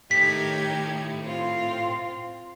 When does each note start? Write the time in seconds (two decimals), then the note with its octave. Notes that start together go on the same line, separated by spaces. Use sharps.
0.11 A2 D#3 G4 G#6 B6
1.22 C4 F4